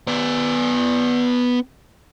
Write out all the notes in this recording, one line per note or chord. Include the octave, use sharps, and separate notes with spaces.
B3 D5